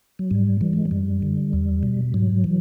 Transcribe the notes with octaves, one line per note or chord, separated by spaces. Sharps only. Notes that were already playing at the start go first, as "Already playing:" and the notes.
F#3
G#2 G3
E3 G3
G#3
G3
F#2
D3
E2
B2
G#2 F#3
E3